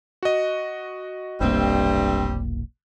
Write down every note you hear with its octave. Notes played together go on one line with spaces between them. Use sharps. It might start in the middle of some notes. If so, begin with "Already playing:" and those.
F#4 D#5
F1 B1 G2 G3 A3 A#3 C4